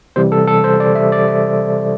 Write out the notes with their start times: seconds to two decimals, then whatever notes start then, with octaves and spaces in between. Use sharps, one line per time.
0.16 C3 E3 G3 C5
0.32 A4
0.48 A4
0.64 C5
0.80 D5
0.95 E5
1.12 D5
1.28 E5